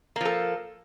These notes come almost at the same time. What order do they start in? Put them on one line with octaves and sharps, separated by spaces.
A#3 F3 A4